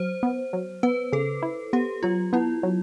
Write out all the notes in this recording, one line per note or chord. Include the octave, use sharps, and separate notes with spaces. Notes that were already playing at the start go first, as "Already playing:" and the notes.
Already playing: F#3 C5
B3
F#3
B3 B4
C#3 A4
E4
B3 G4
F#3 F4
B3 E4
F#3